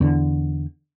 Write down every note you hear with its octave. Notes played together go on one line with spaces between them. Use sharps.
E2 D3